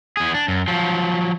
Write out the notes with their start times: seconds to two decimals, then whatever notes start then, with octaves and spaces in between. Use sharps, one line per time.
0.17 E2 G#4
0.34 D4
0.48 F#2
0.68 F3 F#3